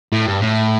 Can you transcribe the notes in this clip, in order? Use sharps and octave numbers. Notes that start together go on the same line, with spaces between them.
A2
G2
A2